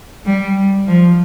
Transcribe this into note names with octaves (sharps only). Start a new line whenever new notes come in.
G3
F3